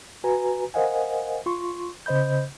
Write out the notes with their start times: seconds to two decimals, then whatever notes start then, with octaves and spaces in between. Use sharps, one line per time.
0.24 F#4 B4 G#5 A#5
0.74 A#4 C5 D#5 F5 F#5 G#5
1.46 F4 C6 C#6
2.06 C#3 C5 D#5 B5 G6